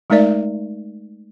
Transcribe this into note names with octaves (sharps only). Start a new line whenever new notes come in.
G#3 A3 D#4 A#4 D5 E5